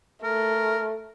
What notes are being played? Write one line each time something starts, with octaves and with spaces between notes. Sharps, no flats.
A3 A#4